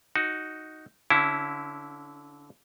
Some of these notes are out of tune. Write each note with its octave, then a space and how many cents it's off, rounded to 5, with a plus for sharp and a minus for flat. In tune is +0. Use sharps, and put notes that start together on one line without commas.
D#4 +0 F#4 +0
D3 -25 C#4 +0 E4 +0